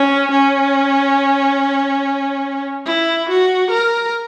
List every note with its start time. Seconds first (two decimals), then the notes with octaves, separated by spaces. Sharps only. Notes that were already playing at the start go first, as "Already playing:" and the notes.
Already playing: C#4
0.31 C#4
2.86 E4
3.29 F#4
3.70 A#4